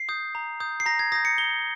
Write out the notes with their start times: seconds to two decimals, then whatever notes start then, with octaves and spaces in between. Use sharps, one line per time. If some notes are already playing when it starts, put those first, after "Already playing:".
Already playing: C7
0.09 D#6 G6
0.35 A#5
0.60 D#6 G6
0.80 C7
0.86 A#5 A#6
0.99 G#6
1.12 D#6 G6 A#6
1.25 C#7
1.38 A#5 G7